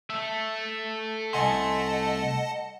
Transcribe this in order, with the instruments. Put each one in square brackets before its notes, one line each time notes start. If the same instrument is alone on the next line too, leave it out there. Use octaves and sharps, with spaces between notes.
[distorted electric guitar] A3 E5
[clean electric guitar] C2 G#5 C6 [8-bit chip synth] D#5 F#5 A5